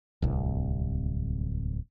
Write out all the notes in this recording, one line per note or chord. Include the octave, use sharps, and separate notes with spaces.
D1 C2